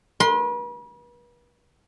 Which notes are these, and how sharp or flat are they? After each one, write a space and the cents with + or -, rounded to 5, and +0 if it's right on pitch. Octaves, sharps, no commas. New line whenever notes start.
B4 -40 C6 +0